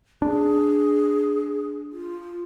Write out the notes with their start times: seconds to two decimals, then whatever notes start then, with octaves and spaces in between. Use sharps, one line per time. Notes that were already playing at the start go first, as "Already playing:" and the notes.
0.22 D4 G#4
1.92 F4